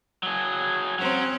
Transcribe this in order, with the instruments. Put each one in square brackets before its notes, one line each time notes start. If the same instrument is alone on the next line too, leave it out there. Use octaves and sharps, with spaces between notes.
[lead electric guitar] F#3 G#4
[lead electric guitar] F#3 [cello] C4 C#4